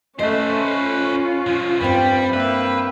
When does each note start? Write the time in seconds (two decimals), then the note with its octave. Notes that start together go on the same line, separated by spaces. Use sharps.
0.19 A3 C#4 B4 C5 D#5
0.76 F4
1.47 D3 F3
1.80 G2 G3 C4 G5 B5
2.33 A#3 B4 E5 G5